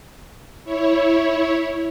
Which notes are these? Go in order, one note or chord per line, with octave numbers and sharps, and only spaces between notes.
E4 C#5